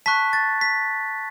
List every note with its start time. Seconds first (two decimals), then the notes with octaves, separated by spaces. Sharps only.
0.06 A5 C#6 F#6 B6
0.33 A6
0.61 B6